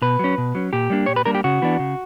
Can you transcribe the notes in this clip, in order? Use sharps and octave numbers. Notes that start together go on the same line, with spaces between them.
B2 B4
F#3 C#4
B2
F#3 C#4
A#2 G4
G3 A#3 D4
A#2 C#5
B4
G3 A#3 D4 A#4
G4
C#3 F#4
E3 B3 D4
C#3